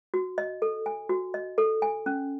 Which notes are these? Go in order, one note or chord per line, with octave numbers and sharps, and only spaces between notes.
F#4
D#5
A4
G#5
F#4
D#5
A4
G#5
C#4